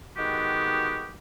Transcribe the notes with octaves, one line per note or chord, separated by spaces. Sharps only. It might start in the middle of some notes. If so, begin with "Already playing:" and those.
D#3 G#3 B3 F#4 G4